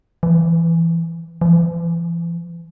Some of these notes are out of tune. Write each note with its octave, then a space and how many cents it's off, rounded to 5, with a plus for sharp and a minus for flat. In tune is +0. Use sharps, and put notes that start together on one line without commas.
E3 +15
E3 +40